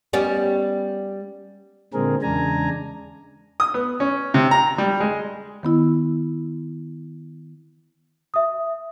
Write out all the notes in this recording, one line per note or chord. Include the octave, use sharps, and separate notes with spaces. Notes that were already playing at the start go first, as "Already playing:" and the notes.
G3 B3 C#4
A#2 D3 G#3 C4 G#4 A#4
E2 C#3 G#3 D4 G#5 A#5
D#6
B3
C#4
C3
A#5
G3
G#3
D#3 B3 E4
E5 D#6